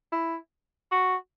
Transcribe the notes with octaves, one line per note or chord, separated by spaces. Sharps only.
E4
F#4